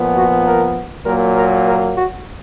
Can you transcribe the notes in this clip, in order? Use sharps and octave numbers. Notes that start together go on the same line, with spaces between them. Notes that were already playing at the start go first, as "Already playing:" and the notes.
Already playing: A#2 F3 B3
F#4
A#4
A#2 F#3 A#3 A#4
A#4
A#4
F#4